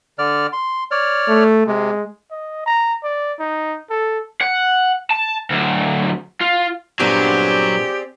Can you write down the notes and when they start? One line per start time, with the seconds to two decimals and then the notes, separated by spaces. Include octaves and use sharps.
0.19 D3 D5 F6
0.53 C6
0.91 C#5 D5 F6
1.28 A3
1.67 C3 G#3
2.31 D#5
2.66 A#5
3.03 D5
3.39 D#4
3.90 A4
4.41 F#5
5.10 A5
5.50 D2 F#3
6.41 F4
7.00 G2 A#2 F#3 B3 C4 G4 G#4 D5